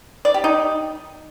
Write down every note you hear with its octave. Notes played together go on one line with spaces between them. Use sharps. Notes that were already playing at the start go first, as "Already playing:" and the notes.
D5
G4
D#4